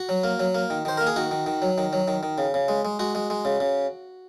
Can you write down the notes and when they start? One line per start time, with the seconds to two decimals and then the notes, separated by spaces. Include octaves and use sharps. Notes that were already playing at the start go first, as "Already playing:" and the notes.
Already playing: F#4
0.09 F#3
0.24 A#3
0.40 F#3
0.55 A#3
0.70 D#3
0.85 D#3 C5
0.97 A#3 A#4
1.07 G#4
1.16 D#3 F#4
1.31 D#3
1.46 D#3
1.62 F#3
1.78 D#3
1.93 F#3
2.08 D#3
2.23 D#3
2.38 C#3
2.54 C#3
2.68 G#3
2.85 G#3
2.99 G#3 F#4
3.15 G#3
3.30 G#3
3.45 C#3
3.60 C#3